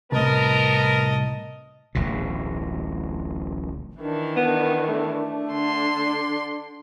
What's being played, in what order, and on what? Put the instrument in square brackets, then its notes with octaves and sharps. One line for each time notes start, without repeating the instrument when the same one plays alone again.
[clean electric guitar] C2 A2 [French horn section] B3 A#4 [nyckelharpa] D#5 A5
[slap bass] D1 A1 B2
[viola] D#3 E3 [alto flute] D4
[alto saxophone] B3
A3
[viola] D3 C6
[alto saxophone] D5